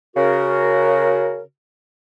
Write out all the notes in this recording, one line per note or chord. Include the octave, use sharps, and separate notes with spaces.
C#3 F#4 A#4